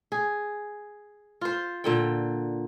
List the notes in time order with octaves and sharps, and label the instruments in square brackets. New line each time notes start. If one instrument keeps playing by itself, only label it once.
[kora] G#4
F4 C5
A#2 D3 G5